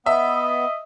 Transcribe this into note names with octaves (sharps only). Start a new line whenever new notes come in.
B3 D#5 E5